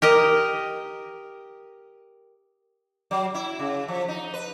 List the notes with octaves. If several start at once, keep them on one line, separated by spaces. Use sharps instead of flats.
G4 A#4 D#5
F#3
E4
C#3
F3
D#4
B4